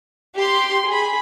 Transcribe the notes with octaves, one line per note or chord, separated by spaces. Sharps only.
G4 C6
G#4 B5